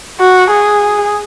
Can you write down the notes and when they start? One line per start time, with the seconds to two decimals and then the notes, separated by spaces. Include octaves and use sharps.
0.20 F#4
0.51 G#4